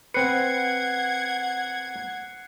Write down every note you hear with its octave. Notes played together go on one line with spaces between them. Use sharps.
C4 B4 F#5 F#6 G#6 C7 C#7